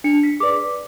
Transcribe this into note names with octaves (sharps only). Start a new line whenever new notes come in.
D4 C#7
B6
G#4 B4 D5 D6
D6